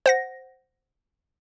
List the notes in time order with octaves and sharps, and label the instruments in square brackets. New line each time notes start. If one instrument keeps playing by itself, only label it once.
[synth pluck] C5 F#5 A#6